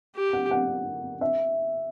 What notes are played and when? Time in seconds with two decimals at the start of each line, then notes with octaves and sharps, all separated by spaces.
0.16 G4
0.33 F#5
0.51 F#5
1.21 E5